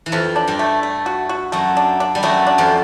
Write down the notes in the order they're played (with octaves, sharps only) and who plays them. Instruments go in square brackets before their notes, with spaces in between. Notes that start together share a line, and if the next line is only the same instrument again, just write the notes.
[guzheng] E3
[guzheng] F2 F3 [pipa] A3
[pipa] D4
[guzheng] G2 G3
[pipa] A3
A3
F#4
F#4
[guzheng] F#2 F#3 [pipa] A3
[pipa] D4
D4
[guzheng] G3
[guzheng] F#2 F#3 [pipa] A3
[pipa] D4
[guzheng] F2 F3